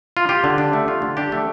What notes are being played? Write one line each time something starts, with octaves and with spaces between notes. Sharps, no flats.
F4
F4 G4
D3
D4
A3
F4
D3
D4 G4
A3